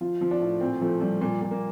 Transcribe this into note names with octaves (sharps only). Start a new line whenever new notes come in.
F3 F4
F3
D4
A2
A#2 C4
F3 A3
F3 G3
A#2 G3
A#2
A#3